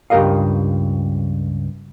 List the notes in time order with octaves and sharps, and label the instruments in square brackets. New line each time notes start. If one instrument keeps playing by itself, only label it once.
[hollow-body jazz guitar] C#2 G2 G4 A#4 D#5 F5